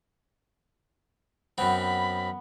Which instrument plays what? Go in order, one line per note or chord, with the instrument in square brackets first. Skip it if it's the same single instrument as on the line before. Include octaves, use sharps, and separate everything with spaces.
[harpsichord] F#2 C4 [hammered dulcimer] B3 [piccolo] B5